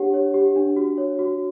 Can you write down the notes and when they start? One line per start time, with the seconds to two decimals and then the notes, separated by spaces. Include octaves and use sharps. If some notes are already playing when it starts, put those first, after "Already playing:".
Already playing: D4 G4 C#5 F#5
0.14 C#5
0.34 G4
0.56 D4
0.76 F#4
0.98 C#5
1.19 F#4